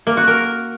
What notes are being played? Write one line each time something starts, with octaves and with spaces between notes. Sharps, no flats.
A#3
F#4
A#4